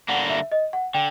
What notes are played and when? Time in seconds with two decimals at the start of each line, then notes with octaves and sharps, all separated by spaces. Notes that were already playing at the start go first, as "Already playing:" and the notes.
0.08 D3 G3 A#3 F#5
0.30 E5
0.52 D#5
0.73 F#5
0.94 D3 G5